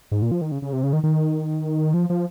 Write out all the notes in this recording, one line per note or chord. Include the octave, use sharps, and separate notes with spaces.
G#2
A#2
F3
D#3
C#3
C#3
C3
C#3
D#3
D#3
F3
F3